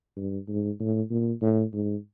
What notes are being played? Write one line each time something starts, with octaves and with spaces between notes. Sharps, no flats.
G2
G#2
A2
A#2
A2
G#2